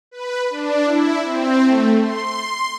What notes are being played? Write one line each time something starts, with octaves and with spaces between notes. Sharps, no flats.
B4
D4
E4
C4
A3
C6